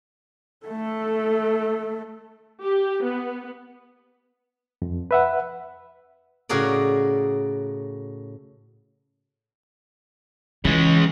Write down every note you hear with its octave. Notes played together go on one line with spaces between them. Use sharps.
A3 A4
G4
B3
F2
B4 E5 F#5
A2 C#3 F#4 G#4 A#4 D5
C#3 E3 G#3